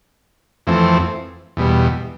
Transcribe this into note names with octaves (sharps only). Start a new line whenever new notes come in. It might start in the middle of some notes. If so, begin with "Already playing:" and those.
F2 E3 A3 C4
E2 B2 G3